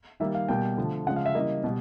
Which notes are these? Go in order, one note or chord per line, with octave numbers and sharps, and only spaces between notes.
D#3 G3 A#3 E5
F5
B2 G3 A#3 G5
D3 F3 A3
C#3 F3 G#3 F#5
F5
E5
C#3 E3 G3 A#3 D#5
B2 G3